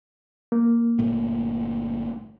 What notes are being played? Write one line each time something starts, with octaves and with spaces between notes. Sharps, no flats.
A#3
G1 A#2 A3